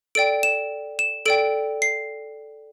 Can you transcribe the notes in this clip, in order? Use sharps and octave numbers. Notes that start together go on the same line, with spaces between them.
A4 D5 G5 D7
E7
E7
A4 D5 G5 D7
C7